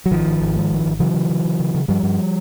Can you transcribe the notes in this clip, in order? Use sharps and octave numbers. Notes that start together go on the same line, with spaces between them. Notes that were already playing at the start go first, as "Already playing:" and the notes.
F#3
G#1 D#3 F3
G#1
G#1
G#2
G#1
G#1
C#3 E3 F#3
C#3
C#3
C#3
C#3
C#3
G2 F3 G3
G2